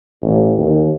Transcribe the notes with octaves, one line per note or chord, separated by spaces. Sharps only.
A1
D#2